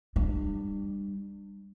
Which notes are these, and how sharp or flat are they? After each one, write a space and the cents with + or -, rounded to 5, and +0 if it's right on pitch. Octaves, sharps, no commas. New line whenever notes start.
G3 +20 D4 +35